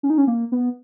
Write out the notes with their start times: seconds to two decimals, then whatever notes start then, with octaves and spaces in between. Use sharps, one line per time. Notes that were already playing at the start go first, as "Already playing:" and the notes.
0.03 C#4
0.10 D#4
0.18 C#4
0.27 A#3
0.52 B3